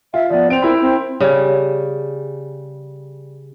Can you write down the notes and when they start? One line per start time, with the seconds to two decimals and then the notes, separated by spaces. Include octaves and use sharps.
0.14 F4 E5
0.30 F3 B3 D5
0.50 C4 D7 F7
0.62 E4 A#4 B5
0.81 C4
1.20 C#3 G3